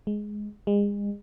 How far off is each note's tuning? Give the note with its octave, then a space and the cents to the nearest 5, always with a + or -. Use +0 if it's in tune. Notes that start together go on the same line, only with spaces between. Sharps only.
G#3 +5
G#3 -35